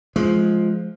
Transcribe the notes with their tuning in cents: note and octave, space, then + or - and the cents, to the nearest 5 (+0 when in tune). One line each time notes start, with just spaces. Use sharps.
F3 +0 G#3 +15